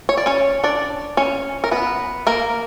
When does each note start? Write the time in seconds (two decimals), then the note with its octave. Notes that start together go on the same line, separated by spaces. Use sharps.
0.09 C#5
0.17 D5
0.26 C#4 C#5
0.64 D4 D5
1.17 C#4 C#5
1.64 A#4
1.71 B3 B4
2.27 A#3 A#4